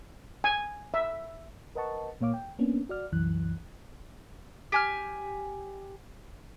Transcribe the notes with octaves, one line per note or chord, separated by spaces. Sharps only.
G#5
E5
A#4 B4 D#5 F#5 A5 C#6
A#2 A#3 C#5 F5 D6
G5
A#3 B3 C#4 D4
F#4 D5 F6
C2 F#2 E3 F#6
G4 G#5 F6